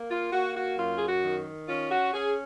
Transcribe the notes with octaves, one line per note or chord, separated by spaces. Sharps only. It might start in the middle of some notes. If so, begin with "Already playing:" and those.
Already playing: A#3
F4
A#3 F#4
F#4
F#2 F4
G#4
F#4
D#3
C#4 F4
F#4
C#4 G#4